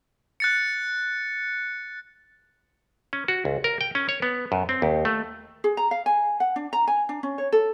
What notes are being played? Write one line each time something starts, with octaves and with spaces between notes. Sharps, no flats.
F#6 A6 C#7
C#4
F#4
C#2
A#4
G5
C#4
C#5
B3
F#2
C4
D#2
A3
G#4
A#5
F5
G#5
F#5
D4
A#5
G#5
D4
C#4
C#5
A4